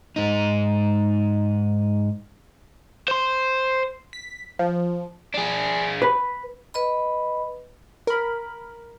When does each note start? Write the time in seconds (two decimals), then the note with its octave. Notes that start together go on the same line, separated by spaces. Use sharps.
0.16 G#2 D#4
3.08 C5 C6
4.13 B6
4.59 F3
5.34 D4 G#4
6.02 B4
6.74 B4 D#5 B5
8.07 A#4 B5